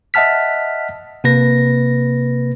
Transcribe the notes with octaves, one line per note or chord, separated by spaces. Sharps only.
D#5 E5 F#5 A5 F6 B6
C3 A#3 B4 A#6